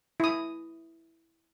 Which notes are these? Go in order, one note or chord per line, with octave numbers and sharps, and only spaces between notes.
E4 D#6